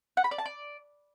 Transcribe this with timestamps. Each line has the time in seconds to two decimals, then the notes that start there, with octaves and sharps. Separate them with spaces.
0.17 F#5
0.24 B5
0.31 D5
0.38 A5
0.46 D5